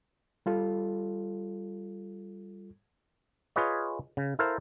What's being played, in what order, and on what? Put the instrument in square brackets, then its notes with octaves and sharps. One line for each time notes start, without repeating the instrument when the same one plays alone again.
[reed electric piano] G3 F4 A4
[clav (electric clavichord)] F4 G#4 B4 C#5 D#5
C#3
E4 A4 A#4 C5 F5